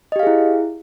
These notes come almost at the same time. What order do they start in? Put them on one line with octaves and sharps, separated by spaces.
D#5 G4 F5 G#4 E4